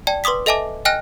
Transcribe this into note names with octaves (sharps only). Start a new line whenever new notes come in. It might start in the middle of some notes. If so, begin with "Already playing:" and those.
D5 G5 A5
B4 C6 D6 D#6 B6
A4 D#5 E5 G#5 A5 D6
D#5 G5 G#5 F6 F#6 A#6